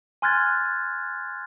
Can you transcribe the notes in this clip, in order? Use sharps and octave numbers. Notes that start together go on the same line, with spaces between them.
G#5 C6 F6 F#6 G#6 A6